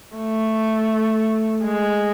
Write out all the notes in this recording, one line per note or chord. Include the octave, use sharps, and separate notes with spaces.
A3
G#3